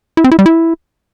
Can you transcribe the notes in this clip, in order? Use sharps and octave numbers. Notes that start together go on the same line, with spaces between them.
E4
C4
E4
G3
E4